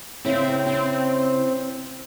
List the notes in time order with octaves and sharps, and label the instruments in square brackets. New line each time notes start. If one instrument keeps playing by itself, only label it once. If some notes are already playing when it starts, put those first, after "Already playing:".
[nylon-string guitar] C#3 E4 [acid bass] C4
[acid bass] C4